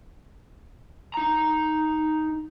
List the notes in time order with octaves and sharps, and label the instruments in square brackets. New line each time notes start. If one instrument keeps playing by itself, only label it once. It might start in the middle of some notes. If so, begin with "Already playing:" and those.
[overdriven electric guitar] D#4 A#5